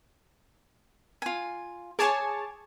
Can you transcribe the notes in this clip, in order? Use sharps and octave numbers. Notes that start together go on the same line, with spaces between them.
F4 G#5
G#4 C#5 G#5 A5 D6